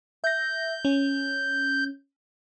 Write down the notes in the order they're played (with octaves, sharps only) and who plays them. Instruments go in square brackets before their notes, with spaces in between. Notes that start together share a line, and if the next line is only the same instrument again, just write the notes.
[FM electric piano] E5 A#6 [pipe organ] G6
[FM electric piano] C#4